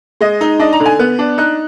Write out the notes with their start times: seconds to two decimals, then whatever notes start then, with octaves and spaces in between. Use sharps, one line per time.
0.21 G#3 D#5
0.41 D#4
0.59 D4 D#5
0.73 A#5
0.80 D3
0.86 G#5
0.99 B3 F#6
1.19 D4
1.38 D#4 F#6